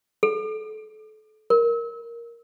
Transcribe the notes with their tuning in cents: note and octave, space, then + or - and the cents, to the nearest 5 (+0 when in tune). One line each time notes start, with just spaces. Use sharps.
A4 -30
A#4 +5